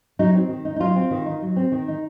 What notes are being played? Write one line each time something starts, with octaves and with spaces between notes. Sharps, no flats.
F#3 D#4
C4
D#3
D#4
D#4
F#3 F4
C4
D#3
D#4
F#3
C4
D#3
D#4